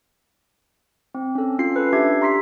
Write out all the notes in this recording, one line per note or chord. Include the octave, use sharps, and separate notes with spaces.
C4
C#4 A4
C#4 F4 C7
A4 B4
D4 G4 E5 G#6 C7
A#5 C6 B6 C7